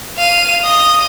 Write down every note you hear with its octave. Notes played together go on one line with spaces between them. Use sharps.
F5 D#7
D#5 D#6